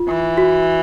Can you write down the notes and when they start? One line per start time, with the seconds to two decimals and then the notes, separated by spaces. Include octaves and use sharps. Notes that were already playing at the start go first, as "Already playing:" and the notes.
Already playing: F4
0.08 E3
0.38 F#4